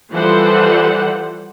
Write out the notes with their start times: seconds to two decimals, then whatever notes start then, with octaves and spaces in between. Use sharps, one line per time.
0.11 E3 F3 G3 A4 C5 F#5